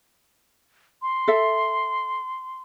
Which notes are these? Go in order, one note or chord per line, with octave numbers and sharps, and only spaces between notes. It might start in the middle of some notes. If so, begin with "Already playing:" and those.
C6
A4 E5